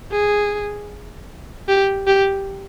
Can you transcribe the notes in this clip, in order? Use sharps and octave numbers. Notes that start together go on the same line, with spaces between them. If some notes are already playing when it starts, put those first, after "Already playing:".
G#4
G4
G4